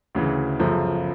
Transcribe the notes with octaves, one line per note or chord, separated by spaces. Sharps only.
D2 C#3 E3
G1 F#2 C#3 F3 A3